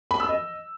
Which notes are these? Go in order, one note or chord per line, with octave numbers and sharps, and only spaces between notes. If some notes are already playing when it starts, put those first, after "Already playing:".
B5
E6
D#5